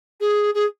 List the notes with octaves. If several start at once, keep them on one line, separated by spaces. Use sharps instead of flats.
G#4
G#4